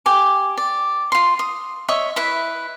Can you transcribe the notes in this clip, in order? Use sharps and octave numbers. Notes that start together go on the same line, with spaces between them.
G4 G#5 D6
D5
F4 C6
D#6
C#5 D#5 E5 C#6
E4 B4 E5